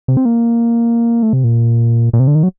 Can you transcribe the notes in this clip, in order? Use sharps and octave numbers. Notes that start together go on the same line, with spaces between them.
C3
C4
A#3
A3
C3
A#2
A#2
C3
D3
D#3
F#3